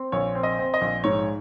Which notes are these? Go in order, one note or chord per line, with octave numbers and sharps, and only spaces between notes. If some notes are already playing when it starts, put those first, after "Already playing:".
Already playing: C4
A#1 C#5
C4
D#5
C4
D#5
A#1
G#2 C#5